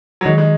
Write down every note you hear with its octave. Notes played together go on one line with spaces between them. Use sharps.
F#3
D#3 G#3
G#3